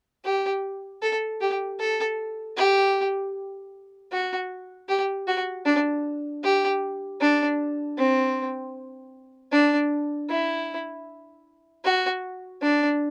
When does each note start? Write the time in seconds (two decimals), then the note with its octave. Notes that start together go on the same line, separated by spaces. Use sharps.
0.25 G4
1.02 A4
1.41 G4
1.79 A4
2.57 G4
4.12 F#4
4.89 G4
5.27 F#4
5.66 D4
6.44 G4
7.21 D4
7.98 C4
9.52 D4
10.30 E4
11.84 F#4
12.62 D4